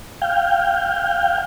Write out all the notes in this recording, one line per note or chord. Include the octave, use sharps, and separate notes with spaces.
F5 G5